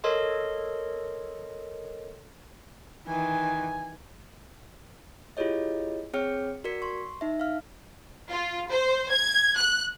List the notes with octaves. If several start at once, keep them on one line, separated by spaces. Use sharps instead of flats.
A4 A#4 C#5 D#5 C6
D#3 E3 G#5
E4 F4 G4 G#4 C#5 D#5
C4 G#4 C#5 G5 F6 C#7
F#4 A#4 D5 B6 C#7
C6 C#6
D#4 E5
F5 F6
F4
C5
G#6
F#6